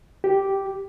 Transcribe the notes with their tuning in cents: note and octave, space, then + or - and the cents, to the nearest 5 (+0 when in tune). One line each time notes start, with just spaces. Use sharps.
G4 -5